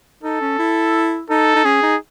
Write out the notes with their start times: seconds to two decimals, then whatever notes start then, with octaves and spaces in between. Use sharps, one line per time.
0.23 D#4 A4
0.41 C#4
0.59 E4
1.30 D#4 A4
1.56 D#4
1.65 C#4 G#4
1.83 D#4